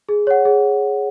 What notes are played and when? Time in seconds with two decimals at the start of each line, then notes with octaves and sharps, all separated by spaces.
0.09 G#4
0.27 C#5 F#5
0.45 G#4